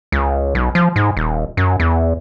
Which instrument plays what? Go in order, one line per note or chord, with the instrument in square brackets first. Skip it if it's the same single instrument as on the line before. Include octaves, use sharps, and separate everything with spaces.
[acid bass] C#2
B1
F3
G#2
D#1
F#2
E2